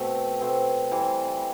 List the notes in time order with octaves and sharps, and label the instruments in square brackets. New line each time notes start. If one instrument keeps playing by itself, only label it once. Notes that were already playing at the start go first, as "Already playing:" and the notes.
Already playing: [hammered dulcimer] B2 A3 C4
B2 A3 C4
E3 G3 C4